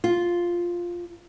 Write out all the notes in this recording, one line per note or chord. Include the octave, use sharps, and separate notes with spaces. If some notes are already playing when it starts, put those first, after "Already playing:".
F4